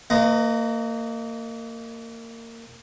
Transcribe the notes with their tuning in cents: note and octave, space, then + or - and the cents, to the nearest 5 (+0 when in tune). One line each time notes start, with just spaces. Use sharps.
A#3 -25 B4 +30 D#5 +0